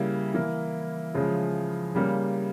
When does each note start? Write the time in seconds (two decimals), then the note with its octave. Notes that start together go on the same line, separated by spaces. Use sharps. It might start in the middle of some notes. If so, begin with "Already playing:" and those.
Already playing: C#3 G3 A#3 E4
0.34 E3 A#3
1.14 C#3 F3 G#3
1.95 C#3 G3 A#3